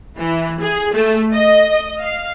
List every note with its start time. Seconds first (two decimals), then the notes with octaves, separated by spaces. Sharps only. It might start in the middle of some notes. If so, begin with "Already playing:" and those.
0.18 E3
0.60 G#4
0.94 A3
1.32 D#5
2.00 F5